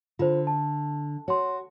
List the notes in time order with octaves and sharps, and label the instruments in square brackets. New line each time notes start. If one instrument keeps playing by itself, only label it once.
[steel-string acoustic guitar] D3 [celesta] F4 C5
[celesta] A5
[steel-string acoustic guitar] F#4 [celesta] C#5 C6